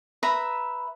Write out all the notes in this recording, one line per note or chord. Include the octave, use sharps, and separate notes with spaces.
B4 E5 A#5 B5